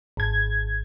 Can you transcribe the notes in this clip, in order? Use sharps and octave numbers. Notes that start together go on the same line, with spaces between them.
G#1 G#6